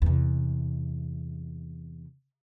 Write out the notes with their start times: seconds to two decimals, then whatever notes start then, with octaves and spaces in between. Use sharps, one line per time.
0.02 E2 C3